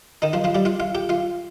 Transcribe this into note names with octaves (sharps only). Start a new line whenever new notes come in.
D#3 D#4
F3 F4
F3 F4
G3 G4
F4 F5
F4 F5
G4 G5
F4 F5